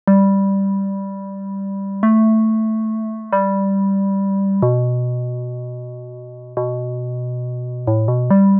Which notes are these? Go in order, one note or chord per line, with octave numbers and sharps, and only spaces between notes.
G3
A3
G3
B2
B2
A2
B2
G3